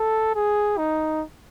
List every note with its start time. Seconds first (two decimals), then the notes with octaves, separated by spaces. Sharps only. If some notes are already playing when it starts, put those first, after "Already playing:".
Already playing: A4
0.35 G#4
0.78 D#4